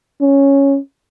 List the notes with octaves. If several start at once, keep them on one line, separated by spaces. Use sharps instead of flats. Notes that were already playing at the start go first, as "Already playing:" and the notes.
C#4